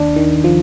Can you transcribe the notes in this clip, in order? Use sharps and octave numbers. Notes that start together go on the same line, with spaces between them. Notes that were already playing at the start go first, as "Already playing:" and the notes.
Already playing: D#2 D4
D#3
F3